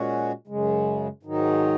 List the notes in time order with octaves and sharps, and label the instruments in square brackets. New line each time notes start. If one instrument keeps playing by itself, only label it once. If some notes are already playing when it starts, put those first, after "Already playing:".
Already playing: [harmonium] A#2 G#3 C#4 F#4
F#2 C#3 G#3
G#2 D#3 F#3 D#4